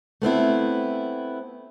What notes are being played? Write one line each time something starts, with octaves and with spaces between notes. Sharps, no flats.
A3 B3 C4 E4